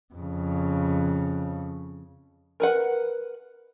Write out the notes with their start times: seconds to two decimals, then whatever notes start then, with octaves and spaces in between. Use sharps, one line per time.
0.14 F2 C#3
2.60 A#4 B4 F#5